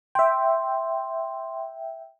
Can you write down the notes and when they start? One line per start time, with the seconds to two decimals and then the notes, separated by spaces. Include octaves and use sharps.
0.15 E5 G5 C6